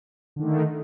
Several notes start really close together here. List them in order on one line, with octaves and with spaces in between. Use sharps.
D3 D#3 A3